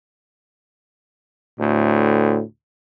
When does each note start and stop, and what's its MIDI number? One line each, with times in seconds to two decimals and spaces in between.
1.60 2.40 38
1.60 2.43 45